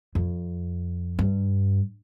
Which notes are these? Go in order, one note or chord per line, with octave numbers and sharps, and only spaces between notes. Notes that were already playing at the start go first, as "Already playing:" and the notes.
F2
G2